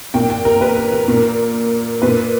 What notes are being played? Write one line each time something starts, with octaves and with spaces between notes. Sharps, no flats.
A#2 G5
G5
A#4
B4
A#4
A#4
A#2
A#2 B4